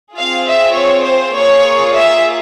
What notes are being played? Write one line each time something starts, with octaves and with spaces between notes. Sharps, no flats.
C4 F4 G#4 F5
E5
C#5
C5
A#3 F4 G#4 C#5
E5